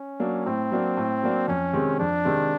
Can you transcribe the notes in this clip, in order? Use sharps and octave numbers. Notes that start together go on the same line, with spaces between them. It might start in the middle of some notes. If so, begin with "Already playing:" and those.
Already playing: C#4
F#3 A#3 D4
A2 C4
F#3 A#3 D4
A2
F#3 A#3 D4
F2 C#4
C3 D#3 G#3 C4
F2 D4
C3 D#3 G#3 C4